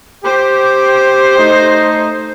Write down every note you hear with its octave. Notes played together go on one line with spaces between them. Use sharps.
G4 C5
A3 D#4